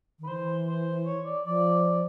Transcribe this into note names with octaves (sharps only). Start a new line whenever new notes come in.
D#3
B4
E3 C5
C5
C#5
D5
F3 D5